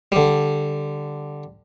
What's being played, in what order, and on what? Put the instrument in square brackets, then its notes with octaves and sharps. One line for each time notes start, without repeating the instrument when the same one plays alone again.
[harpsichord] D3 G3